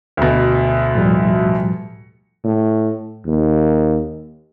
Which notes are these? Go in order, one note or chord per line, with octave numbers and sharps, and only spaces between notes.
D2 B2
A2 F3 G3
A2
D#2